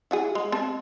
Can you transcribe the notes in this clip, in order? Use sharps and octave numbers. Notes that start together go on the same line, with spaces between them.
E4 F#4 G#4
G#3
C4 A5